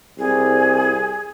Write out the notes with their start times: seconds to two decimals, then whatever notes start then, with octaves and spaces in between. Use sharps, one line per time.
0.18 C2 G#4